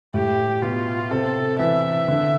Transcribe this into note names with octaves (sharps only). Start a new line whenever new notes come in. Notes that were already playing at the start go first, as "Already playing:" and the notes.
A2 G4
B2 F4
C3 A4
E3 E5
D3